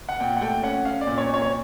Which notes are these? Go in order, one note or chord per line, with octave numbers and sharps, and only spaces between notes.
F#5
A#2 G5
F#5
A3 G5
C#4 F#5
C#4 F5
D5
A#2
C#5
A#2 C#5
C#5